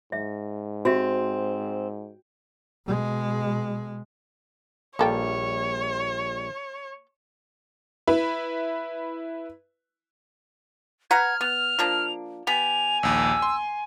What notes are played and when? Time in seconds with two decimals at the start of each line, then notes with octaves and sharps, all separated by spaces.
0.12 G#2 E5
0.85 C4 F#4 G4 E5
2.86 B2 G#3
4.99 A#1 G3 A#3 A4 C#5 G5
8.07 E4 B4
11.11 B4 F#5 A#5 F6 G#6
11.41 B3 F7
11.79 F3 A#3 D4
12.47 B3 G4 G#5 F7
13.03 A#1 D#2 E6
13.42 C6